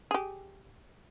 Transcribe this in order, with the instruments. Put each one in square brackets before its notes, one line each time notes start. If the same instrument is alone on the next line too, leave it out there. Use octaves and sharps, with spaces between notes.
[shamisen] G4 G#4